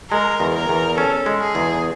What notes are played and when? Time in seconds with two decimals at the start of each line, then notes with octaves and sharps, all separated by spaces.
0.11 G#3 A#4
0.40 E2
0.55 A#4
0.69 E2
0.98 C#4 A4
1.26 G#3
1.41 G#4
1.55 E2